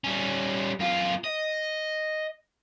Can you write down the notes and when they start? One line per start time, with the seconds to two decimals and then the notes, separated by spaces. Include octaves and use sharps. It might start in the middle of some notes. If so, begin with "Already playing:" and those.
0.04 G3 C#4
0.79 F#2 F4
1.24 D#5